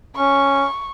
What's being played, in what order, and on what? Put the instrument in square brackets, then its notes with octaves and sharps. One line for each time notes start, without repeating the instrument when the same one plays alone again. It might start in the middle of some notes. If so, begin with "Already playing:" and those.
[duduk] C#4 [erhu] C#6